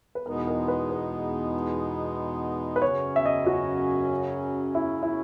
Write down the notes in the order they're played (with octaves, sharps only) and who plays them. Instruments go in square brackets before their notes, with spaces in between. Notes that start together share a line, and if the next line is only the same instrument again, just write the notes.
[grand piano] B4
[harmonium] E2 B2 G#3 B3 D#4 [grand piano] A#4
[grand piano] A#4
B4
B4
B4
[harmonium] F#2 C#3 F#3 C#4 [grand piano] C#5
[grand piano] E5
D#5
F#4
E4
E4